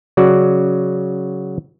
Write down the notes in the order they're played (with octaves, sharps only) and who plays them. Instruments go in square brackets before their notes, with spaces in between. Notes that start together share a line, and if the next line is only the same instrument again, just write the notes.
[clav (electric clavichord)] C#3 F#3 F#4 D5